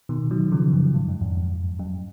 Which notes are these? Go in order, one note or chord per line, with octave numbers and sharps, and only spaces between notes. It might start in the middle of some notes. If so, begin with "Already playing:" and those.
B2 D#3
D#3 F#3
C#3 F3
F#2
G#2
F#2
F2 G#2
F2
F#2